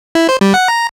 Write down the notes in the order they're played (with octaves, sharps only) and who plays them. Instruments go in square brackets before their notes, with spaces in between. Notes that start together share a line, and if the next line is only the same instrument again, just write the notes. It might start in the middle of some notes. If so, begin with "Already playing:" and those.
[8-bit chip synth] E4
C5
G3
F#5
A#5